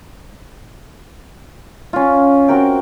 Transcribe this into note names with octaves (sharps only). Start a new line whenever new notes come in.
C#4 F4
C4 F#4 A#4 G5